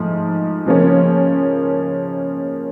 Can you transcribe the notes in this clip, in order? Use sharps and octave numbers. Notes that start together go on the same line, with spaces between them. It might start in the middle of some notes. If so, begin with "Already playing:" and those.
Already playing: G#2 F3 A3
C#3 F3 A#3 C#4